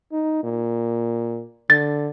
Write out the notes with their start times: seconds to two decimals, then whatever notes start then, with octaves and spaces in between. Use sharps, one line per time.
0.12 D#4
0.44 A#2
1.70 D3 A6